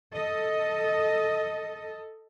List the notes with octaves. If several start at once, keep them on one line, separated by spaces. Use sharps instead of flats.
A4 D#5